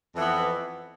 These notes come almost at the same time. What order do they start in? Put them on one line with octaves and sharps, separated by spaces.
F2 E3 B3